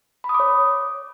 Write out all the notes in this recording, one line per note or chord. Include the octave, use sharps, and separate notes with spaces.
B5
D#6
D6
C#5